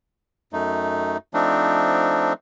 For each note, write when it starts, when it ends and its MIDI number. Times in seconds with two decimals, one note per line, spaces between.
0.53 1.17 42
0.53 1.17 57
0.53 1.17 63
1.34 2.33 53
1.34 2.33 57
1.34 2.33 60
1.34 2.33 62
1.34 2.33 63